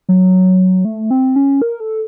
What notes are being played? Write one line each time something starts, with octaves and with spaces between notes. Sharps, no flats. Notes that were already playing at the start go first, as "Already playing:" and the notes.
F#3
A3
C4
C#4
A#4
A4